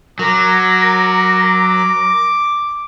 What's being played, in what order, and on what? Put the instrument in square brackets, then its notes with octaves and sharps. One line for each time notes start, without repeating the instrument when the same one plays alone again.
[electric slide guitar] F#3 [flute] A#4 [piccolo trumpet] D6